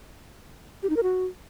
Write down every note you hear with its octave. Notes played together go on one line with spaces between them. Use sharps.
G4
D#4
A#4
F#4